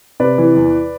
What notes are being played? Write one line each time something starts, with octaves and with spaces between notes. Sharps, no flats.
C3 B4 D5
E3
E2